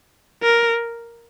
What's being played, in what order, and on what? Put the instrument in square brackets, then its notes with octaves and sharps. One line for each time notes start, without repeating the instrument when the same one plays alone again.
[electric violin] A#4